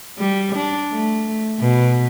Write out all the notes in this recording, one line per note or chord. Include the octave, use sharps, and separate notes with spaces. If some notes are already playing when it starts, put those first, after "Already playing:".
G3
D4
A3
B2